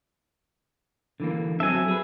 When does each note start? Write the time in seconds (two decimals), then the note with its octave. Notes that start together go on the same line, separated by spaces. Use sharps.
1.20 D3 E3 A#3
1.60 F#3 C4 A4 E5 G#5
1.88 G#4 B4